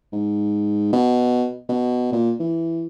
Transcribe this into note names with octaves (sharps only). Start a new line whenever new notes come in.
G#2
B2
B2
A#2
E3